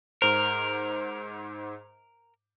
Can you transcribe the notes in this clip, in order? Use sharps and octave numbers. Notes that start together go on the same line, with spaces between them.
G#2 A#4 C5